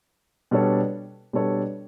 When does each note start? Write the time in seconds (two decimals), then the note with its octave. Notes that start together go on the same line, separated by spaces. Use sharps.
0.51 B2 G3 D4 A4 C#5
1.33 B2 G3 D4 A4 C#5